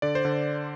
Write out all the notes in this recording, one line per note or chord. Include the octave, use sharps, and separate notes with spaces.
D3 D5
C5
D3